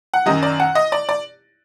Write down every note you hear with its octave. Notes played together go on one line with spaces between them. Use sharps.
F#5
F#2 D#3 F#3 D#5
D5
F#5
D#5
D5
D5